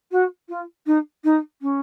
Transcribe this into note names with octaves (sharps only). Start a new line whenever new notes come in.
F#4
F4
D#4
D#4
C#4